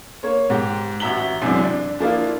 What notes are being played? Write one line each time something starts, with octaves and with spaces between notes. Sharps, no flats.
A#3 C#5
G#2 G4
A1 F#4 E5 A#5 B6 G7
F#2 C3 E3 G#3 D4
D4
F3 A#3 D4 E4 F4